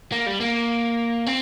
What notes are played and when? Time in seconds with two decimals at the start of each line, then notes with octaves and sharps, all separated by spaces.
0.12 A#3
0.26 G3
0.40 A#3
1.26 C4